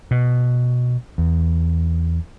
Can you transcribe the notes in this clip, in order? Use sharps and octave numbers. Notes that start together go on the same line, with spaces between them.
B2
E2